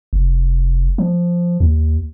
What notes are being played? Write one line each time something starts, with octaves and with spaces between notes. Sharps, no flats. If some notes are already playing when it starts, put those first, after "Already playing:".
F1
F3
D#2